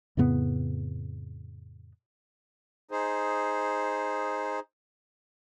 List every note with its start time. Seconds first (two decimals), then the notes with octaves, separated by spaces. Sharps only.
0.17 F2 A2 C#3 B3
2.91 D#4 G#4 C5